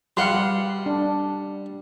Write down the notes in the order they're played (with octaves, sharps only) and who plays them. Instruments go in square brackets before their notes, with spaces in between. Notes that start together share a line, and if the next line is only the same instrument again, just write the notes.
[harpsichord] G3 [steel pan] F5 F#5 C6
[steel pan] D4